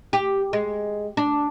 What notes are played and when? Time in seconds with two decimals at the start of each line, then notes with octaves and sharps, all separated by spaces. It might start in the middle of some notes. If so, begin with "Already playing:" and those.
0.13 G4
0.53 G#3
1.17 D4